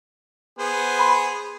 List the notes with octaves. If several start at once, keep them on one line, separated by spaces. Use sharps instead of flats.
B3 G#4 C5
B5 C6